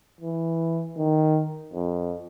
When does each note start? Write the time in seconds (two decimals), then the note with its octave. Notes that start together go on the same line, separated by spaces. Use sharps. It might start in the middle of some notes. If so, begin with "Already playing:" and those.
0.21 E3
0.98 D#3
1.73 F2